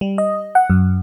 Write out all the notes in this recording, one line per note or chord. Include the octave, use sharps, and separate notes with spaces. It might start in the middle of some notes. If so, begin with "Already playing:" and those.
G3
D#5
F#5
F#2